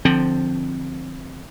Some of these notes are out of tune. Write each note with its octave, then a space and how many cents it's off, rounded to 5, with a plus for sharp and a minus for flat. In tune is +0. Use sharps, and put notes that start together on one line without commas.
D3 +20 F3 +0 C4 +0